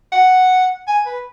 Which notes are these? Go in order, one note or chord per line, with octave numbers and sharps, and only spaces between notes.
F#5
G#5
B4